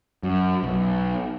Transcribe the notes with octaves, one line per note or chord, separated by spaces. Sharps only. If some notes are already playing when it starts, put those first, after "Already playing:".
F#2
B1